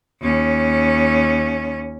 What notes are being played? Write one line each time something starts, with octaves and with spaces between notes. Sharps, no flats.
D#2 C#4